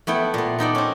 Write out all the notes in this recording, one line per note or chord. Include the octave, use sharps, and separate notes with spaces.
A3 B3 E4 G5
A#2 B3
B3 D#4 A4 D5
C4 C#4